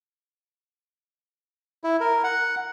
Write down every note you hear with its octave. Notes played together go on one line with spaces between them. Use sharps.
E4
A#4
F#5